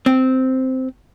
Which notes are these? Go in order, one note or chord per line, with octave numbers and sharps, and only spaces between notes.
C4